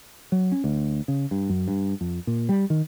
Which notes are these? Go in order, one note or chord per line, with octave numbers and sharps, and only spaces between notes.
F#3
C#4
D2
C#3
G2
F#2
G2
F2
A#2
G3
D#3